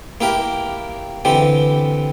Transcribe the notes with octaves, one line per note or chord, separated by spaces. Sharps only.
A#3 E4 G4 A#4
D3 E3 C4 G4